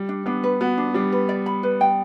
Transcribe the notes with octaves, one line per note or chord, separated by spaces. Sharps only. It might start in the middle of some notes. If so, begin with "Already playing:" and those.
Already playing: G3
D4
B3 D4
B4
B3 F#4
D4
G3 D4
B4
D5
B5
B4
G5